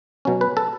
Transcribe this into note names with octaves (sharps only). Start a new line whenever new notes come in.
B2 F#3 C#4
B4
A4